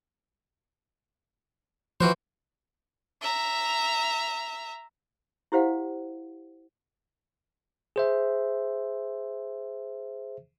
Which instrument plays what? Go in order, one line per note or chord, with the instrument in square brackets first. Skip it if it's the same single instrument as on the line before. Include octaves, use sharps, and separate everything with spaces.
[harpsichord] E3 F#4 C5 [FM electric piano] F3
[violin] E5 A#5
[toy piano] E4 G4 C5 F5 F#5
[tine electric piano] G#4 C5 E5